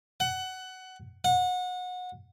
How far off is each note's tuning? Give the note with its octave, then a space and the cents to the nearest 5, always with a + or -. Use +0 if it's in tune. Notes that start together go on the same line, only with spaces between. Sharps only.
F#5 +20
F#5 -25